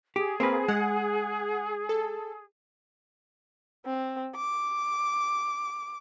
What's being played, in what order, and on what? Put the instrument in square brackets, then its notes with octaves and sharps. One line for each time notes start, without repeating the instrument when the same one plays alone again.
[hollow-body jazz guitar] G4 [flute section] G#4
[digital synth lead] A#3 [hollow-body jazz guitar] C4 B4
[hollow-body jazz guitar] G#3 [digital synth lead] F#5
[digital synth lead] A4
[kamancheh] C4
D6